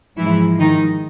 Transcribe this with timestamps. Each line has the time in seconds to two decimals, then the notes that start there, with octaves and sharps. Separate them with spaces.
0.17 G#2 E3 F3 G#3 E4
0.59 D#3 D#4